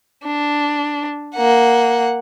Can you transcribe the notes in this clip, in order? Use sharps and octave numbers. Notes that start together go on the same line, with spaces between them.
D4
A#3 F#5